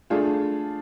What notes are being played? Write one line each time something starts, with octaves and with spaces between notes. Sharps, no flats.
A3 D4 F4 G#4